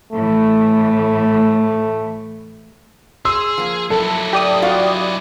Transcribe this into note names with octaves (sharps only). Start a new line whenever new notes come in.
A2 E3 A3
G#4 C6 E6
F3 A#3
F#3 E4 A4
G4 D5 D#6
F4 F#4 F5